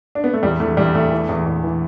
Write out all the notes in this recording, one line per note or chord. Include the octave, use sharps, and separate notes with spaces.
D4
B3
A3
E2 G3
E2 A3
E2 G3
E2 A3
E3
E2
E2
E3